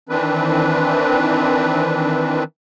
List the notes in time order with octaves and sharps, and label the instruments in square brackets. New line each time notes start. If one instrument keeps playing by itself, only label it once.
[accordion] D#3 E3 C4 D4 B4